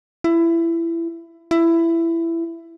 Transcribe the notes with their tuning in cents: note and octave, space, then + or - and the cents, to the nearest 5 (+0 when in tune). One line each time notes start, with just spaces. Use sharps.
E4 +20
E4 +15